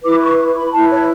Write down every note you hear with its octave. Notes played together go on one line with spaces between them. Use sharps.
E4 B4 D6
C#6
B5
E4 B4 A5
C#5